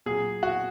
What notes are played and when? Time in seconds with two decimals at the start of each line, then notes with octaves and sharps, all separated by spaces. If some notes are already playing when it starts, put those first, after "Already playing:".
0.06 A#2 F#3 G#4
0.43 F#4